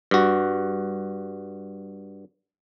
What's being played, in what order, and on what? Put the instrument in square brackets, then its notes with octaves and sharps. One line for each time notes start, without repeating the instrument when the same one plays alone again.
[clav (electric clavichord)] G2 F#4